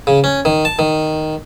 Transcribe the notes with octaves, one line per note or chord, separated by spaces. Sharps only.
C#3
C#4
D#3
A5
D#3